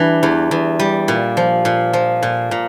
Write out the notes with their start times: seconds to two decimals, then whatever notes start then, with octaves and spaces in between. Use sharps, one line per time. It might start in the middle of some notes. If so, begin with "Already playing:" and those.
Already playing: E3 G3 D4
0.23 E2
0.51 E2
0.79 G3
1.08 A#2
1.37 F3
1.65 A#2
1.93 F3
2.22 A#2
2.51 A#2